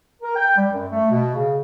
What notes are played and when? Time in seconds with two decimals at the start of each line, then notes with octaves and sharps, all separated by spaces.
0.22 A#4
0.35 G5
0.56 G3
0.72 F#2
0.92 A3
1.11 B2
1.34 C#3